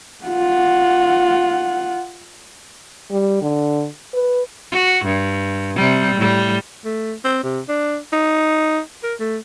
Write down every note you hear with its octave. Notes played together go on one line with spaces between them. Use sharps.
F4 F#5
G3
D3
B4
F#4
G2
C3 G3
A2 G3
A3
C4
C3
D4
D#4
A#4
A3